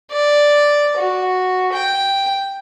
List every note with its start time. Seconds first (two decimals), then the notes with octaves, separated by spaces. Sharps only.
0.11 D5
0.96 F#4
1.73 G5